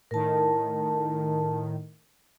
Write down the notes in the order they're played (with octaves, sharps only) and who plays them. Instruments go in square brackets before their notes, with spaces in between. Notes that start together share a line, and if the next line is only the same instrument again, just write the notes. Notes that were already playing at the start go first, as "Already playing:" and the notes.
[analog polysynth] A2 D#3 [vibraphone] A#4 A5